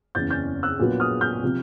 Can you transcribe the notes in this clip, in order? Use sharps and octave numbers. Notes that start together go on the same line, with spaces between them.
F#1 E2 C#3 G6 A6
G6 A6
E6 F#6
A#1 A#2 F#3 B3
D#6 F6
F6 G6
C3 F3